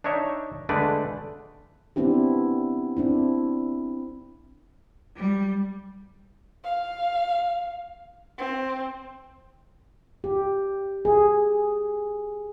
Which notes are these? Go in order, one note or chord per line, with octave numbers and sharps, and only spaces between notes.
D4 D#4 C#5 E5 G5
D3 G#3 A3 D4 B4 D5
B3 C4 D4 E4 G4
C4 D4 E4
G3
F5
C4
G4
G#4